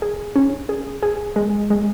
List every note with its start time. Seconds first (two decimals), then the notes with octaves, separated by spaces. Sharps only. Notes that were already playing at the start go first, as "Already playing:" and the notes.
0.02 G#4
0.36 C#4
0.69 G#4
1.03 G#4
1.36 G#3
1.70 G#3